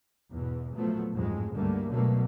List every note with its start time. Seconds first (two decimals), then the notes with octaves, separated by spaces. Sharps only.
0.31 E2 G#2 B2 E3
0.74 A#2 F3 F#3 A3 B3
1.13 A1 F2 G#2 G#3
1.54 C#2 G2 D3 G3 A3 A#3
1.88 B2 D3 F#3 A3 A#3